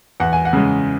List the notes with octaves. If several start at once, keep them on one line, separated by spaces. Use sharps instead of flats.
E2 F#5
G#5
F#5
C#3 G#3